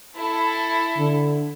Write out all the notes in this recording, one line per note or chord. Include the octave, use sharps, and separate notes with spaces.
E4 A4
D3